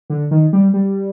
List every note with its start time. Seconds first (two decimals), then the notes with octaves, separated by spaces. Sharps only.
0.10 D3
0.31 D#3
0.53 G3
0.74 G3